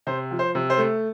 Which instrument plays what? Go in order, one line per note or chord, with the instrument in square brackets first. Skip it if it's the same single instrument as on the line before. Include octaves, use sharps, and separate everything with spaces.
[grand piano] C3 C5
F3
C5
C3
C5
A3